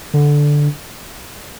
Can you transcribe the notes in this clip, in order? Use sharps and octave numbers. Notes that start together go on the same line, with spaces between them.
D3